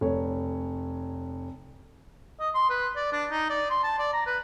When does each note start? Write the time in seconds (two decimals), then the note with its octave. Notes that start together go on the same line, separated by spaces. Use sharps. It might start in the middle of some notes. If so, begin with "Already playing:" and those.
0.01 F1 C#5
2.40 D#5
2.54 C6
2.70 B4
2.96 D5
3.12 D4
3.31 D#4
3.50 D5
3.70 C6
3.83 A5
3.99 D5
4.13 A#5
4.26 B4